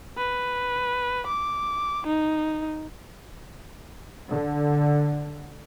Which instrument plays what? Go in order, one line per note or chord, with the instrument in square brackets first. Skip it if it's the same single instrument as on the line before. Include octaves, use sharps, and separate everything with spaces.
[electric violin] B4
D6
D#4
[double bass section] D3